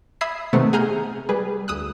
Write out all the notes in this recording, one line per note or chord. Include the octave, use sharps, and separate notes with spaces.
E5 B5 D#6 E6 G#6 C7
C3 D#3 A3 B3
G#4 F#5 G#5 A#5 F6 G6
G3 G#4 B4
D2 D#6 E6 F#6